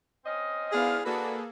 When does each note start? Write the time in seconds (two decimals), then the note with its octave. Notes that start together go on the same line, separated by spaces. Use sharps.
0.25 C4 C#4 D#5
0.72 G#2 B3 D4 E4 G#4 F5
1.05 A#3 D4 F#4 G#4 A4 B4